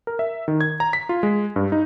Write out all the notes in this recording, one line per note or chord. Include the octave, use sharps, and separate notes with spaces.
A#4
E5
D#3
G#6
A#5
B6
F4
G#3
G2
D#4